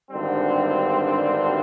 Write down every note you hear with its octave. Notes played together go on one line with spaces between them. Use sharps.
G#1 G2 D3 G3 C4